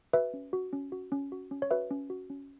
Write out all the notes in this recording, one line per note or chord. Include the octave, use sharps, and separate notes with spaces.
F#4 B4 E5
C#4
F#4
C#4
F#4
C#4
F#4
C#4
C#5
F#4 B4 E5
C#4
F#4
C#4